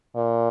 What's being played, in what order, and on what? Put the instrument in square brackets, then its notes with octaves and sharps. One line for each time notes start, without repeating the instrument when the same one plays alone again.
[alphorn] A#2